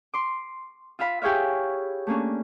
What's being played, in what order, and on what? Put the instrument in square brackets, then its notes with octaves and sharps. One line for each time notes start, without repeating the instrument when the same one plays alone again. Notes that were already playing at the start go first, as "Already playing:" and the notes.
[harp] C6 D6
F4 E5 F5 B5
E4 G4 G#4 C#5 E5 F5
A3 A#3 C#4 D4